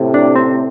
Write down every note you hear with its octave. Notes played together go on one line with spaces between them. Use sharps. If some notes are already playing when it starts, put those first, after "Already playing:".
Already playing: A2 C3
D4
C4